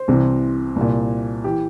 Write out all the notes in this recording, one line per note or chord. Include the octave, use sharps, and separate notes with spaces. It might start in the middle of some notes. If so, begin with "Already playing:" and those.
Already playing: C5
C2 C3 E3
C2 A#2
E3 G4